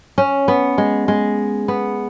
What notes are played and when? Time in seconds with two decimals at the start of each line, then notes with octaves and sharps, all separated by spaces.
0.18 C#4
0.48 B3
0.78 G#3
1.08 G#3
1.68 B3